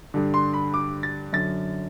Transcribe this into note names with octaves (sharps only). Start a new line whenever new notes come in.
G2 D3
C6
B5
D6
A6
F#2 D3 A6